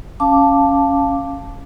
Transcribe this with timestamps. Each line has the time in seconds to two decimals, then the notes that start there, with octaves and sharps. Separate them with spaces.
0.20 C#4 F5 A5 D6